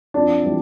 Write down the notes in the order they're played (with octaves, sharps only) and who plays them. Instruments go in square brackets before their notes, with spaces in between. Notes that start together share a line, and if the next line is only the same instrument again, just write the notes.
[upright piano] F2 D4
E3 G3